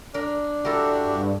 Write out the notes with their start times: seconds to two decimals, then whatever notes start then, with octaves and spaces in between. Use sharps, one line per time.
0.14 D4 A#4
0.65 E4 F#4 G4 A4 A#4
0.95 G2